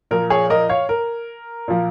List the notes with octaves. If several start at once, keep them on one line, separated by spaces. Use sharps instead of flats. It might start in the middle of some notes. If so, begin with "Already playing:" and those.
A#2 F3 A#4
G#4 C#5
A#4 D#5
C#5 F5
A#4
A#2 F3